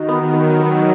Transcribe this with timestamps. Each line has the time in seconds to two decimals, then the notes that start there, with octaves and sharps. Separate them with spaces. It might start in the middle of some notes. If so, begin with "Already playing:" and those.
Already playing: D#3 D#4 F#4
0.09 B3
0.33 F#3 B3
0.60 B3